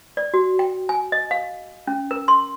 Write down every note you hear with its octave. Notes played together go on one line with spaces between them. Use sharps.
D5
F#4
G5
G#5
D#5
F5
C#4
A#4
C6